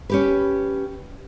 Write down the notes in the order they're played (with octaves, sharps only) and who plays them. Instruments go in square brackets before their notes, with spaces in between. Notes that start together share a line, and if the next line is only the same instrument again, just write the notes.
[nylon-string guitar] C#4 G4 B4